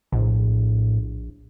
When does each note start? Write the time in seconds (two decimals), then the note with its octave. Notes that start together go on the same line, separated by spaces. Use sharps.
0.12 A#1 A2